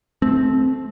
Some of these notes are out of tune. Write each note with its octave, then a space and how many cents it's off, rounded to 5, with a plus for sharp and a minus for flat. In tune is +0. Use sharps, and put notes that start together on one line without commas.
A3 -20 C4 +0